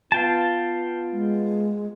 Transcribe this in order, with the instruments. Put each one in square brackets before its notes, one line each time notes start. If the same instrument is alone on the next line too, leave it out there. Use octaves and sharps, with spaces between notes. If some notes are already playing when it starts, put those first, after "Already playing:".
[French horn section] B3 F4 [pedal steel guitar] F5 G5 A5
[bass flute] G#3